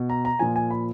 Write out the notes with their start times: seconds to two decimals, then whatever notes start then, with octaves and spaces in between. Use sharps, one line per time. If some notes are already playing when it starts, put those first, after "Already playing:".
Already playing: B2
0.10 A#5
0.25 A#5
0.39 A#2 F3 G#5
0.56 G#5
0.71 B5